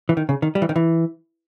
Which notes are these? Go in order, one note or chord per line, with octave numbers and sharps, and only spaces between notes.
E3
D#3
C#3
D#3
G3
E3
D#3
E3